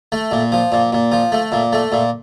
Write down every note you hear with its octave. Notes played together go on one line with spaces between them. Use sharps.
A3
A#2
F3
A#2
A#2
F3
A3
A#2
A3
A#2